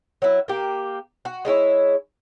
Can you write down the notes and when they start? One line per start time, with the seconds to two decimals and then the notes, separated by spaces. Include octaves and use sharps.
0.22 F#3 E4
0.48 A#3 G4
1.25 F#4
1.45 G#3 D4 E4 C#5